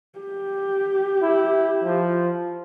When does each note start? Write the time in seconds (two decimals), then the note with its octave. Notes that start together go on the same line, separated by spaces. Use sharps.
0.19 G4
1.23 E4
1.84 F3